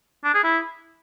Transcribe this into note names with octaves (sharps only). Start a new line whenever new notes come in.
D4
G#4
E4